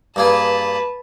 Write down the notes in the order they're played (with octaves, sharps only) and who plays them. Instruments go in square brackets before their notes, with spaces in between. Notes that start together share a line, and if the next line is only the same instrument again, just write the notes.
[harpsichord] G2 A#3 G#4 [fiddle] B4 A5